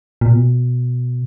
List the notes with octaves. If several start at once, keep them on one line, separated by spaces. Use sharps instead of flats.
A#2
B2